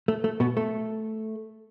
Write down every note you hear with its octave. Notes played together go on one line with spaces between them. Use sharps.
A3
A3
B2 B3
A3